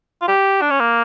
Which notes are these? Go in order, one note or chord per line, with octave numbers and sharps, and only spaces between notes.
F4
G4
D4
C#4
A#3